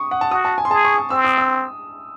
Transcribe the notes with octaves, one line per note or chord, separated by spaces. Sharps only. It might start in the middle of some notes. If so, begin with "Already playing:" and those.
Already playing: C#6 D#6
F#5
A5
F#4 D#6
A5
G#5
C6
G#4 A5
C#6
D#6
C4 E6
D#6
E6